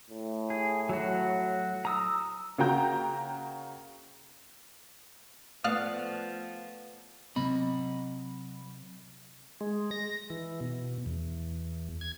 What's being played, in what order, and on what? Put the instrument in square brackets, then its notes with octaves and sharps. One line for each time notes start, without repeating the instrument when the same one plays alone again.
[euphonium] A2
[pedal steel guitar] G#4
F#3 F#4
A#5 D#6 E6
[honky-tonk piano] C#3 A#3 F#4 G5 A#5 G6
[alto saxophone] F3 [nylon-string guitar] A3 B3 [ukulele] D5 F5 [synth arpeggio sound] D#6 F6 F#6
[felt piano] C3 [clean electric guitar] F#3 D#5 B5
[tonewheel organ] G#3
A#6
E3
B2
E2
G#6